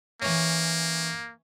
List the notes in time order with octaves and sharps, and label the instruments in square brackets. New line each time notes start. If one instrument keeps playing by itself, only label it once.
[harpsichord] E3 C#4 [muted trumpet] A#3